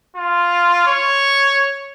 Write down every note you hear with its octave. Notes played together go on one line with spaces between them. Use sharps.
F4
C#5